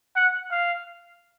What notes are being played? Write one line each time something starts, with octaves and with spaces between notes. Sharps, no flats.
F#5
F5